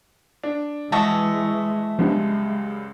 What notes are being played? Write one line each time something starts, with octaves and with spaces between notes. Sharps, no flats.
D4
E3 G#3 A3 F#4 A4 D#5 E5 C#6
C#2 F#2 F3 G3 G#3 B3 D4